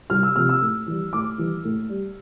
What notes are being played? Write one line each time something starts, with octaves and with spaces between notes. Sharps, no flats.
C2 F6
E6
C3 F3 F6
E6
A2
E3 G3
A2 D6
E3 G3
A2
G3